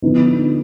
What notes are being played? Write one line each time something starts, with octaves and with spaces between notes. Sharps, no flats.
D3 F3 B3 D#4